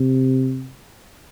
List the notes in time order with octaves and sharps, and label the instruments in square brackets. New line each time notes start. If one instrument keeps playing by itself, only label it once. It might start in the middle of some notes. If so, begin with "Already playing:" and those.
Already playing: [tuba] C3